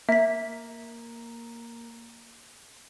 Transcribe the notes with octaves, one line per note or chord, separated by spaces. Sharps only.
A#3 E5 B6